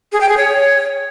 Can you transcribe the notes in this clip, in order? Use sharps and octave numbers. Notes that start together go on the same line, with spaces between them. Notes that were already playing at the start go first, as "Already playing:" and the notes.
G#4
G5
G#4
C#5